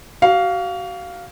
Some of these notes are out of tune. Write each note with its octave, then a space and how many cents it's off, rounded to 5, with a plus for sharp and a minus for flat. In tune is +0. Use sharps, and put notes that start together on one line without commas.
F#4 +35 F5 +0